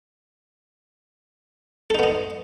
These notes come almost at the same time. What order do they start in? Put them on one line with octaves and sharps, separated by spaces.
A4 D#4 B3 D#5